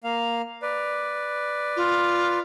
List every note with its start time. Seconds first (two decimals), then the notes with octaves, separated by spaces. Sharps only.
0.04 A#3 F5
0.62 B4 D5
1.76 F4